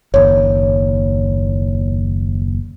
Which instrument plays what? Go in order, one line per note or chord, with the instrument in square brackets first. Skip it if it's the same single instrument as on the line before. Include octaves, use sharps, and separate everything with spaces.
[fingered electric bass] F#1 D#2 [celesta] C#5